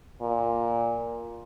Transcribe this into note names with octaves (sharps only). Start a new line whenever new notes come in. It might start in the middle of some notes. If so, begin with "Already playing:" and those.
A#2